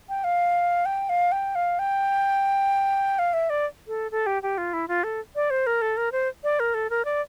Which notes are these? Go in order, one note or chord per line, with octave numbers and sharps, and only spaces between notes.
G5
F5
G5
F5
G5
F5
G5
F5
E5
D5
A4
A4
G4
G4
F4
E4
F4
A4
D5
C5
A#4
A4
A#4
C5
D5
A#4
A4
A#4
D5